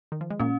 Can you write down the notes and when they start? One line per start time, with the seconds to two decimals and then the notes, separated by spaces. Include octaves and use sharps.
0.12 D#3
0.21 F3
0.30 G#3
0.40 A#2 A#3 C#4